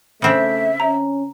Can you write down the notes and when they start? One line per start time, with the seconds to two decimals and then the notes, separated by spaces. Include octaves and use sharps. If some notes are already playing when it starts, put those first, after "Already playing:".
0.22 C#3 A3 C4 D4 E5
0.80 C#4 A#5